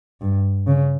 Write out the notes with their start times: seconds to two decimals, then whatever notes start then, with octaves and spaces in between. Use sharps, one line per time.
0.21 G2
0.67 C#3